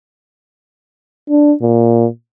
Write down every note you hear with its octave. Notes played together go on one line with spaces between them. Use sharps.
D4
A#2